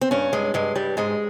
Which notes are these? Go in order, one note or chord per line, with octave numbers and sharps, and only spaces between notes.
C4
G2 C#4
G2 G#3
G2 G#3
G2 G3
G#2 G#3